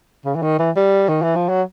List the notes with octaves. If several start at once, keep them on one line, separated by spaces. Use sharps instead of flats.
C#3
E3
D#3
E3
G3
D#3
E3
F3
F#3